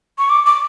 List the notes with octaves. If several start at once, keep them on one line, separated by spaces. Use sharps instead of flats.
C#6
D6
D6